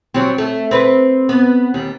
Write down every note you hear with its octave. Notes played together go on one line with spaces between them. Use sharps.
F#3 G3 C4
A3
C4 B4
B3
D#2 G3